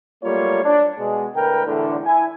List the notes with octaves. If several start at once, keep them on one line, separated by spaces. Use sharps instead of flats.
F#3 G3 A3 A#3 F4 C#5
D4
B2 G#3
A2 D3 A#4 B4 G5
E2 A2 D3
E4 G#5